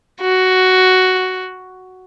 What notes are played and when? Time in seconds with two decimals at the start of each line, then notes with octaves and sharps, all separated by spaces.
0.21 F#4